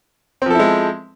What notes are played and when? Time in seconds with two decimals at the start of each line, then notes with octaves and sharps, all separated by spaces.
0.42 C4
0.46 F3
0.51 A4
0.55 E4
0.59 G#3